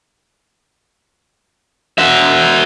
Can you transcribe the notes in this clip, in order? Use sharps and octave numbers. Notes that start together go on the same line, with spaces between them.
F#4 E5